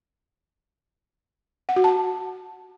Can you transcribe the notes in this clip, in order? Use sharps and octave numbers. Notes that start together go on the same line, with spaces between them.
F#5
F#4
A5